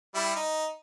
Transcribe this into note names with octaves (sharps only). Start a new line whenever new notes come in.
G3 E4
D#4